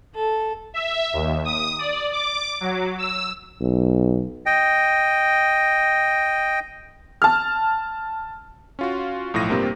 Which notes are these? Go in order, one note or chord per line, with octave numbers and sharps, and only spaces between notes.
A4
E5
D#2
D#6
D5
D6
F#3
E6
B1
D#5 G5
A5 F6
C#4 F4 F#4
B1 A2 F3 A#6 D#7
G2 C3 A#3 C4 F4 G4